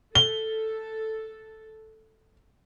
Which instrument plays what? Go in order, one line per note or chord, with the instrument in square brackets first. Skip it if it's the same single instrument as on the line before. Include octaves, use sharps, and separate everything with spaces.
[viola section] A4 [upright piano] G7